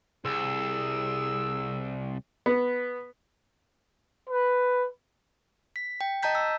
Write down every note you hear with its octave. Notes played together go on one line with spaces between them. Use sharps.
C2 G#4 E6
B3
B4
B6
G5
D#5 A5 A#5 G6 B6
E6